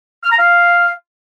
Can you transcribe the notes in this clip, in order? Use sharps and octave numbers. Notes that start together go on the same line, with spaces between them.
F6
A#5
F5